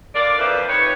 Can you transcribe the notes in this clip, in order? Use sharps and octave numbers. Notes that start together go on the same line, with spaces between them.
D3 F4 A#4 D5
F2 F3 A#3 E4 B4 C5
D#4 G4 B4 C#5